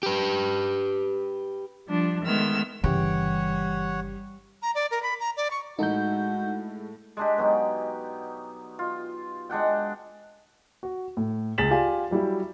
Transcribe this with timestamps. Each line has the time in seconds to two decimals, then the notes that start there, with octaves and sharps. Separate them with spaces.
0.03 G4 B4
1.88 F3 G3 D4
2.23 D#3 G#3 A3 B3 E6 F6
2.84 G1 C#3 E3 G3 G4 C#5 F#5
4.62 A#5
4.75 D5
4.91 A#4
5.03 B5
5.20 A#5
5.37 D5
5.51 C#6
5.79 A2 G#3 D#4 E4 F#4 A4 G6
7.17 G#3 D4 G4
7.38 B2 F#3 D#4 G4
8.79 F4
9.49 G#3 D4 F#5 G5
10.83 F#4
11.17 A2
11.58 C#2 G#4 A6 B6 E7 F#7
11.70 F4 G4 D5 F5 G#5
12.11 F#3 G3 E4 G4